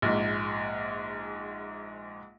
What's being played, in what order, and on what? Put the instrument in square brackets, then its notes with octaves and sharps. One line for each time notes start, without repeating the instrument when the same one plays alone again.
[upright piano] A#1 G#2